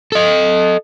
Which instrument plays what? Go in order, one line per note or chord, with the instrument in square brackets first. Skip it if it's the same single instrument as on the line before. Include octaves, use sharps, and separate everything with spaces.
[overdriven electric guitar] A4 D#5